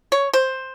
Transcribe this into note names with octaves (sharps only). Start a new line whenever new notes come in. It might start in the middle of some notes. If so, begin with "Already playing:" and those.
C#5
C5